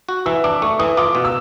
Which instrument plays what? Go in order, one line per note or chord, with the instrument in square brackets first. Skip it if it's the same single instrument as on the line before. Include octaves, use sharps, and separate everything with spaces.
[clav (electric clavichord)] F#4
[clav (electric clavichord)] E3 [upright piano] E6
[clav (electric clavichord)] D4 [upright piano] D6
[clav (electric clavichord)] A3 [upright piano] C#6
[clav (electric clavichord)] E3 [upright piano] D#6
[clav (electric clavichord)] F4 [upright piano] D6
[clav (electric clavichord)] B2
[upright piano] E6